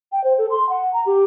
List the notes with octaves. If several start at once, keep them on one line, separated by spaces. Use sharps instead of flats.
G5
C5
A4
C6
F#5
A#5
G4